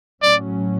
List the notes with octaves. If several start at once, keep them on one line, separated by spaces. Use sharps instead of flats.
A2 F#3 C#4 D5